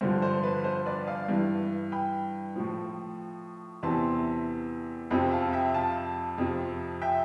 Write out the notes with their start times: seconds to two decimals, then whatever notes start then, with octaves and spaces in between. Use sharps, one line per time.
0.01 G2 D3 F3 C5
0.22 C5
0.43 B4
0.64 C5
0.86 B4 D5
1.07 D5 F5
1.28 G2 E3
1.92 G5 B5
2.56 A2 F3
3.83 E2 C3 E3 A5 C6
5.11 F2 C3 F3 G5 B5
5.31 F5 A5
5.53 E5 G5
5.74 F5 A5
6.38 F2 C3 F3
7.02 E5 G5